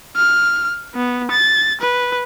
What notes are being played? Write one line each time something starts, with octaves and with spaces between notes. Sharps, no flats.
F6
B3
A6
B4